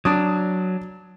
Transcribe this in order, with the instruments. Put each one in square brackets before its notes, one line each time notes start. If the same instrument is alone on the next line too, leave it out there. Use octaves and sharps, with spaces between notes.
[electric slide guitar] F#3 [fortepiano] D4 D#6